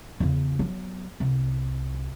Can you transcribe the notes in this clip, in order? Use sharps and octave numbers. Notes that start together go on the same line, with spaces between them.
E2 C#3
F#3 B3
C2